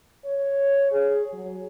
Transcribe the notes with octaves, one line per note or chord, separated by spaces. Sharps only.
C#5
G#4
F#3